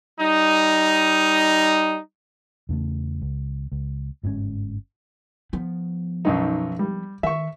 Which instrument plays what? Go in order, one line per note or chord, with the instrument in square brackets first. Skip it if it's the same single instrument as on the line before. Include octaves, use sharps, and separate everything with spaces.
[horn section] G3 D#4
[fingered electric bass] E2 C#3 A3
C#2
C#2
G1 G#2 D3 C#4
[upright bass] F3 B3
[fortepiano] B1 F#2 D#4
G3
[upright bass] D#3 [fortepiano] E5 C#6